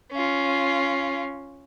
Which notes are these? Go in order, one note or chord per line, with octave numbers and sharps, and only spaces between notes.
C#4 F4